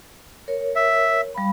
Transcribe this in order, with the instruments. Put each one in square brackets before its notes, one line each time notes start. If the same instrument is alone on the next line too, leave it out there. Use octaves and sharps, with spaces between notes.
[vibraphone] A#4 C#5
[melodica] E5
[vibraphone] G3 F5 B5